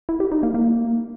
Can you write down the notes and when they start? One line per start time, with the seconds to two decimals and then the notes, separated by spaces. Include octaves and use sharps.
0.09 E4
0.20 G4
0.32 D#4
0.43 A#3
0.54 A#3